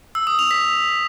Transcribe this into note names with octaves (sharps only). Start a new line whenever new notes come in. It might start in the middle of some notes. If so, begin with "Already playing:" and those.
E6
D#6
F7
B6